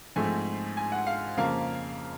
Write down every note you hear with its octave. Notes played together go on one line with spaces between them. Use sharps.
G#2 F3 A3 C4 G#5
G#5
F#5
F5
F2 C#3 F3 A#3 F5